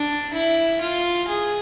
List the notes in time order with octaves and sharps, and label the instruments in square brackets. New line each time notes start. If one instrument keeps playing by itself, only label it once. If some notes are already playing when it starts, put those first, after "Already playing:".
Already playing: [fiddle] D4
E4
F4
G#4